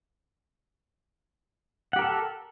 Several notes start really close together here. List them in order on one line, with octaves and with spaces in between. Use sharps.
F#5 G4 A#4 A4